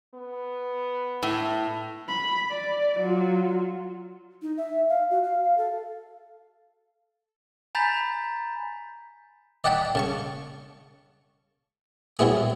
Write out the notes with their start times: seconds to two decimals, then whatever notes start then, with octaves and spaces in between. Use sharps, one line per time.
0.14 B3
1.23 A2
2.08 B5
2.50 D5
3.00 F#3 F4
4.42 D#4
4.57 E5
4.89 F5
5.10 F#4
5.24 F5
5.44 F5
5.58 A4
7.75 G#5 A#5 B5 G6 A6 B6
9.64 D5 D#5 F#5 G5 A5 B5
9.95 C#3 A5 C#6
12.19 F#3 G3 B3 E4 G#4